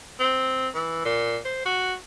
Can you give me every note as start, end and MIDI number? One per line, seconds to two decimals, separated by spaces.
0.20 0.69 60
0.75 1.03 52
1.05 1.38 46
1.45 1.65 72
1.65 1.94 66